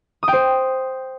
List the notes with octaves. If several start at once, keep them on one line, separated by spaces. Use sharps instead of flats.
D#6
G5
C5